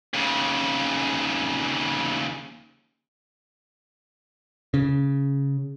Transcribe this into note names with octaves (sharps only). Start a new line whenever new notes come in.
D#2 C#3
C#3